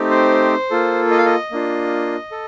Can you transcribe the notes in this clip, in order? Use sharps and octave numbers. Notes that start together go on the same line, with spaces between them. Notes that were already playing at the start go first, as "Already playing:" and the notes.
Already playing: A3 C4 D#4 G4
C5
A#3 F4 A4
D#5
F5
D#5
A#3 D4 F4
A4